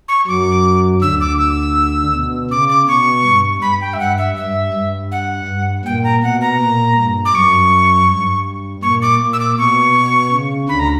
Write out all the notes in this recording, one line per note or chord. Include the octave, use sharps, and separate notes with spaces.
C#6
F#2 F#3 D6
D2 D3 E6
D6
E6
B2
C#3 D6
D6
B2 C#6
G2
G2 B5
G5
E5
G2 F#5
E5
G2 E5
G2
F#5
G2
A#2 G5
A#5
B2 F#5
A#5
A#2
G2
D6
F#2 C#6
G2
A#2 C#6
D6
A#2
E6
D6
B2 C#6
B2
C#3
D2 D3 B5
A#5